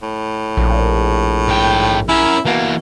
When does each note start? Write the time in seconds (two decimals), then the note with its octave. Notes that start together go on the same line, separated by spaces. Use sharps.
0.02 A2
0.57 A#1
1.48 G#2 G5
2.09 C#4 E4 A#4
2.45 B2 E3 A#3